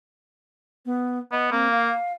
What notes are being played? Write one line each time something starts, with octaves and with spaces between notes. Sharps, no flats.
B3
B3 D#5
A#3 C4
F5